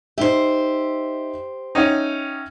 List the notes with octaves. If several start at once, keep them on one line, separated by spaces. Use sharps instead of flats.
D#4 G4 C5 E5
C#4 D#4 E5 F#5 G5